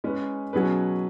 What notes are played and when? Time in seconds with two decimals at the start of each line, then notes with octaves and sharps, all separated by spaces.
0.04 G#3 C#4 G#4 B4
0.53 B2 F#3 C#4 G#4 B4